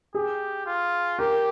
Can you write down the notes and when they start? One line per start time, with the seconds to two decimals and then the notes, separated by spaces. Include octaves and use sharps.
0.14 G4 G#4
0.66 F4
1.19 G4 A#4